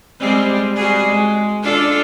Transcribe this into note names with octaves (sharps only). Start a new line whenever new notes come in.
G3 G#3 C4
G3 F#4 G#4
G#3
D4 F4 A4